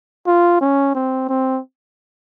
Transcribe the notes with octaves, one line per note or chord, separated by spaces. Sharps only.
F4
C#4
C4
C4